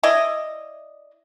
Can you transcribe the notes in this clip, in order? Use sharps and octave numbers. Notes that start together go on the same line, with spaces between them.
E4 D5 D#5